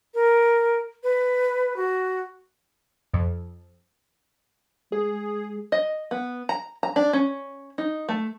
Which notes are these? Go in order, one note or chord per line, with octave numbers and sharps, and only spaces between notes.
A#4
B4
F#4
F2
G#3 G#4
D#5
B3
A#5
A#5
D4
C#4
D#4
A3